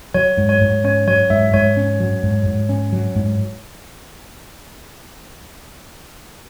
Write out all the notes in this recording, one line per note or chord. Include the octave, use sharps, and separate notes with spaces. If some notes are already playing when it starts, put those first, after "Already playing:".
F#3 C#5
G#2
C#5
G#2
C#4 C#5
F#3 C#5
G#2 E5
G#2 C#5
C#4
F#3
G#2
G#2
C#4
F#3
G#2